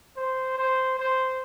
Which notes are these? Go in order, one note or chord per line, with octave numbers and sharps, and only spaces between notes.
C5
C5
C5